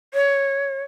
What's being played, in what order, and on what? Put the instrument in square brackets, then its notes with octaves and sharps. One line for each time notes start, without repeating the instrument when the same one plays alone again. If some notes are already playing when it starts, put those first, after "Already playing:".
[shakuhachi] C#5